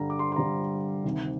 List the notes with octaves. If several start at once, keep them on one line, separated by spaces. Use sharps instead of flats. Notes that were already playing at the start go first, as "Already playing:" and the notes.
Already playing: G2 D3 G3 A#5
D6
C6
C6
G2 D3 G3 A#5
D2 C3 D#3